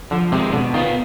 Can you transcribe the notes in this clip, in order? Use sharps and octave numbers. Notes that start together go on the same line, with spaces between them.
D3 F3
C3 G#3 C4
B2 D3
D#3 B3 F4